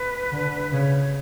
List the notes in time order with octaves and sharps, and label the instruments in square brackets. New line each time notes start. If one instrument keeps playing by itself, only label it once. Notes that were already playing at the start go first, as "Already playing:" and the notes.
Already playing: [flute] B4
[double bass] D3
[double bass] C#3 [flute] C#5